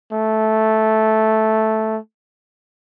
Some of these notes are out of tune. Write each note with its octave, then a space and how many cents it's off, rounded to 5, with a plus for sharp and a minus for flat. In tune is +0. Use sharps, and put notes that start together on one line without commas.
A3 -5